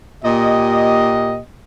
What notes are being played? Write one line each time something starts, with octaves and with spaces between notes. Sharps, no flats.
A#2 G4 D#5